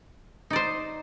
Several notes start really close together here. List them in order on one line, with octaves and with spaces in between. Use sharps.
D#4 D5 C5